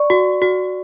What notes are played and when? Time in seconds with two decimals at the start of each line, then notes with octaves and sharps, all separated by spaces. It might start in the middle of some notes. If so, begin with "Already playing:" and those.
Already playing: D5 C#6
0.10 F#4
0.42 F#4